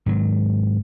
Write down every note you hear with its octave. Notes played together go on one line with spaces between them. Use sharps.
G#2 D#3 F#3